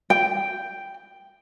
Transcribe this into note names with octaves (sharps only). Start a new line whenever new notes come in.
G5